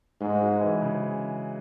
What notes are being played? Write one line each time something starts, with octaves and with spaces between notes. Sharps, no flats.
G#2 G#3
F#3
E3
C#3